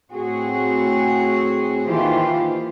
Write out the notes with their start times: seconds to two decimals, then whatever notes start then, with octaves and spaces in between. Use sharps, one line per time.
0.12 A2 C4 F#4 G#4
1.87 D#3 E3 A#3 F4 G4 C5